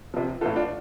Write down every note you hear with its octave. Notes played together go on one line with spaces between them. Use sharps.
C3 F3
A2 E3 F4 A4
D4 F4